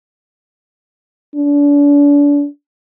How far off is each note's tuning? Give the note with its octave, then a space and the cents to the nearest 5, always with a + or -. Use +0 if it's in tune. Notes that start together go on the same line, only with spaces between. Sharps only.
D4 -35